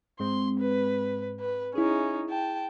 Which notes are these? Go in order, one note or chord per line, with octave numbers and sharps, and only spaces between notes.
G#2 G#3 C4 C6
B4
B4
C#4 D#4 E4 G#4
G5 A5